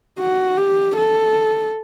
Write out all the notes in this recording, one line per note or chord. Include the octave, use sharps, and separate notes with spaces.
F#4
G4
A4